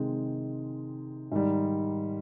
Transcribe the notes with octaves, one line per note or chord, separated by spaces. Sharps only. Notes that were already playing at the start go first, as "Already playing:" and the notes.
Already playing: C3 D#3 G#3 C4
G#2 D#3 G3